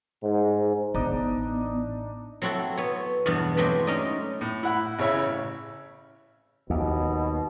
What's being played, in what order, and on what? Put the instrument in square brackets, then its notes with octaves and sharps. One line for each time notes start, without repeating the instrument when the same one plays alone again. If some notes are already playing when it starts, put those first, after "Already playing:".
[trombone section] G#2
[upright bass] A1 [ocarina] B3 [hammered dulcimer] D4 D#4 D#5
[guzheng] F#3 C4 E4 F#4 A4
B3 C#5
E2 G2 B2 B3 A5
F#3 G#3 A3 C4 G4 B4
C#4 D#4 D5 D#5
[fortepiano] A2
E4 F#5 B5
A1 C#3 E4 C#5 E5
[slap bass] D#2 [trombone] B2